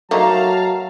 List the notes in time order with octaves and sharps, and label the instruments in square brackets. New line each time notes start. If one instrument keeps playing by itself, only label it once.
[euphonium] F#3 [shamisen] A3 A#3 D#4 [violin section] F5 A#5 [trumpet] A5